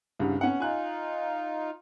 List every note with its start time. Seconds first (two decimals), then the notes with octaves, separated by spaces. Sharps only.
0.19 C2 G2 C#3
0.41 B3 C#4 F#5
0.60 D#4 F4 G#5 F#6